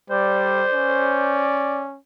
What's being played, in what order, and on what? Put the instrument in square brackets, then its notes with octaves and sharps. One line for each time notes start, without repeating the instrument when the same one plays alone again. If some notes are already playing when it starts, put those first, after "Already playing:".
[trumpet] G3 [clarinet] C5 [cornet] D5
[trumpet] C#4